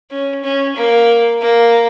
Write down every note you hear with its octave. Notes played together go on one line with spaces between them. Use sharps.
C#4
C#4
A#3
A#3